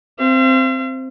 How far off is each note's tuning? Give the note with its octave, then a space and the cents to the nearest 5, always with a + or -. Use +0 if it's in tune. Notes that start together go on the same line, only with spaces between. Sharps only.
C4 +0 F5 -45